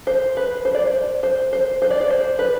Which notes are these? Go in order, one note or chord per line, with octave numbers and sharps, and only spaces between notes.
C5
B4
C5
D5
C5
C5
C5
C5
D5
D5
C5
B4